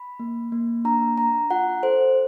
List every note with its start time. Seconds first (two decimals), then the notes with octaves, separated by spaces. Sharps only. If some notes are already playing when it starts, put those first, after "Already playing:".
Already playing: B5
0.19 A#3
0.52 A#3
0.85 D4 A#5
1.18 D4 A#5
1.50 F4 F#5
1.83 A4 C5